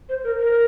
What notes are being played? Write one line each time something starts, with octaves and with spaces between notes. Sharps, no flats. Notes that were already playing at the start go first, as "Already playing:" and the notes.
C5
A#4
A#4